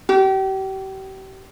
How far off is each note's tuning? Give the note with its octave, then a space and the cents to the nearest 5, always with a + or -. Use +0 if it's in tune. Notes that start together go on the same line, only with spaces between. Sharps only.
G4 -35